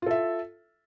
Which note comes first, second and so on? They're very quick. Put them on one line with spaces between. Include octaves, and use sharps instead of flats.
F4 A4 E5